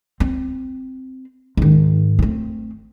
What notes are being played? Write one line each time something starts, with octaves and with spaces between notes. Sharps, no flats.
C4
G#2 D#3
A3 C4